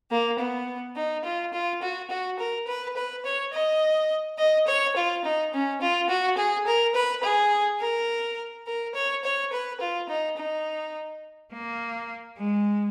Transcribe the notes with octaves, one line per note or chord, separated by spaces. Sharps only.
A#3
B3
D#4
F4
F4
F#4
F#4
A#4
B4
B4
C#5
D#5
D#5
C#5
F4
D#4
C#4
F4
F#4
G#4
A#4
B4
G#4
A#4
A#4
C#5
C#5
B4
F4
D#4
D#4
A#3
G#3